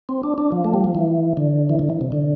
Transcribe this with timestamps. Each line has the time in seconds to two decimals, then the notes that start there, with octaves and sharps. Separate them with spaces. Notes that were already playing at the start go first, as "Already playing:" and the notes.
0.09 C4
0.23 D4
0.38 D4
0.52 F3
0.64 A3
0.74 G3
0.84 F3
0.95 E3
1.37 D3
1.69 E3
1.79 D3
1.90 E3
2.01 C3
2.12 D3